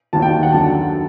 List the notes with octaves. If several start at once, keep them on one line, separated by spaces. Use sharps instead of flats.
D#2 D#3 F#3 A5
G5
F#5
F#2 D3 F#3 A5